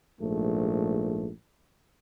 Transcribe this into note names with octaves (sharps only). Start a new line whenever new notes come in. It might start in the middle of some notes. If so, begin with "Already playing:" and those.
A#1 G#2 A3